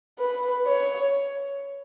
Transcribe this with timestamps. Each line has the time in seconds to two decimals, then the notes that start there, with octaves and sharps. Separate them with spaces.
0.19 B4
0.66 C#5